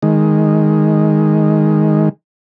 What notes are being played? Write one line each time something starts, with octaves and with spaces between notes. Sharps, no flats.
D#3 G#3